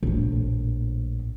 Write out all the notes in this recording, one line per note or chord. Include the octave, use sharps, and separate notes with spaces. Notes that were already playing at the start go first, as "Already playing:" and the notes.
A#1 A2